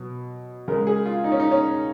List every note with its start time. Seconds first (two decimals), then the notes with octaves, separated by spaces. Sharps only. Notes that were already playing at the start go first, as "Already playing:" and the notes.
Already playing: B2 F#3
0.68 C#3 A#4
0.72 G#3
0.87 G#4
1.06 F4
1.24 D#4
1.32 C#4
1.40 D#4
1.51 C#4